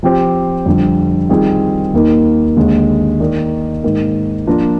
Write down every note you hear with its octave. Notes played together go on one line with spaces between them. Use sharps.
F3 C4 G4 C5
F2 D3 G3
D#3 G3 C4 F4 G#4
D#2 D#3 A#3
D#2 D3 G#3
D#3 A#3 D#4 A#4 D5
G#2 D#3 A#3
F3 A#3 D4 F4 A#4